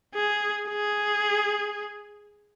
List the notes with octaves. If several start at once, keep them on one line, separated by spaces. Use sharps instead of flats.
G#4
G#4